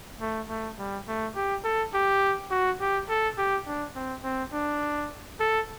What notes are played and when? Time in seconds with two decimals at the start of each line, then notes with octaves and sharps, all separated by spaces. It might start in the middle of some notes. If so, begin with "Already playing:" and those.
0.21 A3
0.49 A3
0.79 G3
1.08 A3
1.36 G4
1.64 A4
1.94 G4
2.51 F#4
2.81 G4
3.09 A4
3.38 G4
3.67 D4
3.96 C4
4.24 C4
4.53 D4
5.40 A4